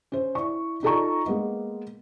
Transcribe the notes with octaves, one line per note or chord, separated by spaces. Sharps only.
C#4 C5
E4 D5 C#6
D#4 F4 A4 D5 A#5 C#6
G#3 A#3 B3 D#5